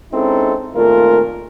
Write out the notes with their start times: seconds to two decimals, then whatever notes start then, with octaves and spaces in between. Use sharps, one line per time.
0.12 G#3 C4 C#4 D#4 E4 A4
0.75 G#1 A#2 A3 F4 A#4